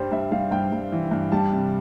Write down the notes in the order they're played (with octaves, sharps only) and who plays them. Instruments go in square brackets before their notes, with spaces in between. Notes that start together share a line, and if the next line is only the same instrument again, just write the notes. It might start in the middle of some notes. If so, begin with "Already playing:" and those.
Already playing: [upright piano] G2 G3 C5
G2 E5
G3 F5
G2 G5
G2
E3
G2
G3 A5
C3